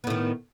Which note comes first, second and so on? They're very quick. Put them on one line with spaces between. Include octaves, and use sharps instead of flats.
B3 A2 D#3